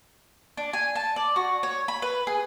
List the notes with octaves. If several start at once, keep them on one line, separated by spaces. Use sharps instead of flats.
D4
G#5
A5
D5
F#4
C#5
B5
B4
G#4